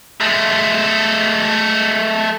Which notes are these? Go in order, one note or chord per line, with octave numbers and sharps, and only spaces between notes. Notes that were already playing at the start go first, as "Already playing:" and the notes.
G#3 A3